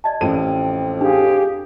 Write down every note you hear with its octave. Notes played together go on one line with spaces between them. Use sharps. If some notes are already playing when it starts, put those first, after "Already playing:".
D5 D#5 A5
A1 F2 G5 D#7
D4 G4 G#4 F5